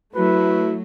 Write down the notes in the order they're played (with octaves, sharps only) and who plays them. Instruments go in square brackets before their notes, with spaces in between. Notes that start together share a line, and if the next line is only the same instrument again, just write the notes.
[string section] F#3 A3 [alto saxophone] E4 [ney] F#4 [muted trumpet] B4